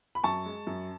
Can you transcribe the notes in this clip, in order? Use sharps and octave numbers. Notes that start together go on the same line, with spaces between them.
B5
F#2 A5 C#6
G#3
F#2